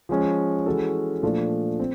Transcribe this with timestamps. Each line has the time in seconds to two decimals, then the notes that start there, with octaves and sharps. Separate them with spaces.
0.09 F3 G#3 C#4
0.66 E3 G#3 C#4 F#4 A4
1.23 A#2 F3 A3 D4 F4
1.79 C4